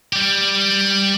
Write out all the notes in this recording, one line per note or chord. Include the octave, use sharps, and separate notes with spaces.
G3 G4